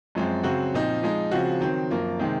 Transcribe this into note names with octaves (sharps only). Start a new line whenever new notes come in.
F#2 F3 G#3 C4
C#3 F#3 C4 F#4
A#2 F3 C4 D#4
F3 G#3 D#4
C#3 F3 C4 F#4
D#3 F#3 C4
F#2 F3 A#3
C3 D#3 G#3 C4